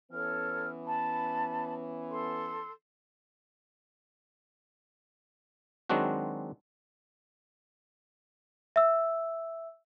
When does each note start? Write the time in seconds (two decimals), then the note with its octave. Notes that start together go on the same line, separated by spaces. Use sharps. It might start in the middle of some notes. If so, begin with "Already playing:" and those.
0.12 E3 B3 C#4 A4 C#5 F6
0.85 A5 B5
2.08 A4 C6
5.89 D#3 F#3 G#3 C4 D4 F#4
8.76 E5 E6